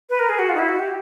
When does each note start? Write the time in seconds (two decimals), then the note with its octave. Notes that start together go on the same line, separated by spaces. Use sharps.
0.10 B4
0.19 A#4
0.29 G#4
0.39 F#4
0.49 F4
0.55 D#4
0.59 E4
0.69 F#4
0.79 G4